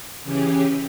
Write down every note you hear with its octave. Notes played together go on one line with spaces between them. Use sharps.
C#3 E3 C#4 G4 G#4